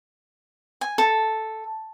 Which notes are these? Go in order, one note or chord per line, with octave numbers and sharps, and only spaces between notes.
G#5
A4